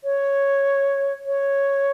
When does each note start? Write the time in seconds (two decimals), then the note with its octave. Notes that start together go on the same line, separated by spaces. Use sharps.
0.04 C#5
1.26 C#5